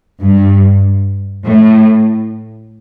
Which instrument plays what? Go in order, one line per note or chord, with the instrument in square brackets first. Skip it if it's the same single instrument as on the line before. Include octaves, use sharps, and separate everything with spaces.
[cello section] G2
A2